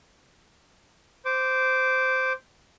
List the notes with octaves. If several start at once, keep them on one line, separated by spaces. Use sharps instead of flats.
C5 D6